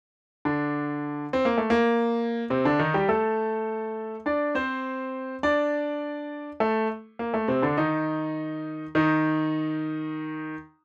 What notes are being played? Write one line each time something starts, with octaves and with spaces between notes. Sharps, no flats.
D3 D4
C4
A#3
A3
A#3
C3 C4
D3 D4
D#3 D#4
G3 G4
A3 A4
D4 D5
C4 C5
D4 D5
A3 A4
A#3
A3
C3 C4
D3 D4
D#3 D#4
D#3 D#4